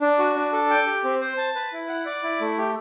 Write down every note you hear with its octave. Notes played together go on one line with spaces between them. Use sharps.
D4
F#4
D4
A4
G5
G4
C4
C5
A5
B4
E4
F#5
D5
E4
A3
G4